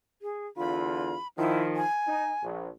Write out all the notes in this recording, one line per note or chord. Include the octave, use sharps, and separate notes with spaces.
G#4
E2 D3 F4 B5
D#3 F3 E4
G#5
D#4
A#1